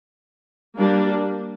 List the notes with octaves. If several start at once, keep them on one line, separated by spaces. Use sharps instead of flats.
G3 A#3 D4